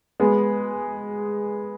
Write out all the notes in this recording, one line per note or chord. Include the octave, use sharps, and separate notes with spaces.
G#3 B3